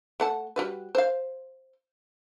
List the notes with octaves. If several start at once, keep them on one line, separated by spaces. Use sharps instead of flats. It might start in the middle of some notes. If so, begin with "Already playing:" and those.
A3 F#5 A5
G3 F#4 B4
C5 F5